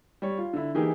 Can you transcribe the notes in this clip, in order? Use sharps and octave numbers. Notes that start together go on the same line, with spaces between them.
G3 C#5
F4
D3 E4
E3 A#3 D#4 G4 G#4